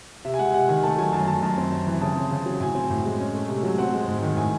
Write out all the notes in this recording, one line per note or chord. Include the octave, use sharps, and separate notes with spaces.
C3 E5
G#5
G#3 F#5
C3 F#5
D#3 G#5
A3 A5
F#3 G#5
F#2 A5
D#3 A5
F#2 A5
C4
F#2
E3
C#3 A5
C4
C#3
F#3
A2 G#5
C4
A2
G#3
C#4
A3
C3
F#3
C4 F#5
G#3
G#2
D#3
A2 G#5